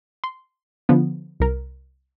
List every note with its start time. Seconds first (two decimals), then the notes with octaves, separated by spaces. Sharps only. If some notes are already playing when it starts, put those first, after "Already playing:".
0.24 C6
0.89 D3 F3 B3
1.40 C2 A#4